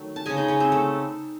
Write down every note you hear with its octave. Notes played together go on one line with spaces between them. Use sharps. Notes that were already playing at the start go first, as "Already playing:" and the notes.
Already playing: D#3 F#3 A3
A5
C#3 G#3 G#4 G#5
D#4 D#5
C#4 C#5
C4 C5
A3 A4